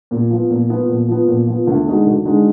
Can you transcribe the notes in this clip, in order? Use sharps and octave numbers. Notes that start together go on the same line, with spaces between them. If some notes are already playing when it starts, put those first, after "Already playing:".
A#2
F3 B3 F4
A#2
F3 B3 F4
A#2
F3 B3
A#2
F3 B3
D2
D3 G#3 D#4 F#4
D2
D3 G#3 D#4 F#4